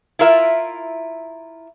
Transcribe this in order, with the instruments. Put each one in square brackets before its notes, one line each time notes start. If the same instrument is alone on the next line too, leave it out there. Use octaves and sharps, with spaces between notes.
[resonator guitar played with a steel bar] E4 F4 A#4 E5